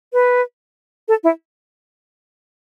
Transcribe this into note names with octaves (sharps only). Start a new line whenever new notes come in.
B4
A4
E4